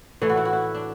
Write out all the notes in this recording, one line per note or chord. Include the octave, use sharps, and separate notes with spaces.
A2 E3 A3 E4
F#4
E4
F#4
E4
D4